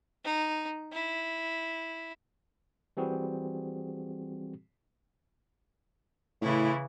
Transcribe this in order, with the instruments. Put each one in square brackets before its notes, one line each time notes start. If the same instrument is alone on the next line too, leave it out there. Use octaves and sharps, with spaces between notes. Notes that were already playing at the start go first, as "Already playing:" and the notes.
[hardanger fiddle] D#4
E4
[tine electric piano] E3 G3 C4 F#4 G#4
[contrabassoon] A2 [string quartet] C#3 E3 E4